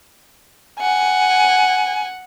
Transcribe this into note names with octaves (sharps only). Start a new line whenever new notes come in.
F#5 G#5